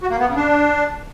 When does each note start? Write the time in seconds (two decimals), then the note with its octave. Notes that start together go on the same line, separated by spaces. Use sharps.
0.01 F#4
0.10 A#3
0.18 B3
0.27 C#3
0.36 D4